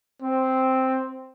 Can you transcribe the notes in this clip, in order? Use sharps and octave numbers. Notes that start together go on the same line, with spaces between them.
C4